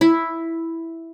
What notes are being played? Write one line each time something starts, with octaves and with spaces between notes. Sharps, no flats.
E4